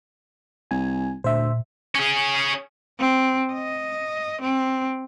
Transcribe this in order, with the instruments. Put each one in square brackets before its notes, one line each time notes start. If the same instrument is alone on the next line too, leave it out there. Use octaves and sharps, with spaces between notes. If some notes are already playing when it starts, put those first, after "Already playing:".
[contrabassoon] C2 [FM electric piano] G#5
[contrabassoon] D2 [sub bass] A#2 [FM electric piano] C5 E5
[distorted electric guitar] C#4 G#4
[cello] C4
D#5
C4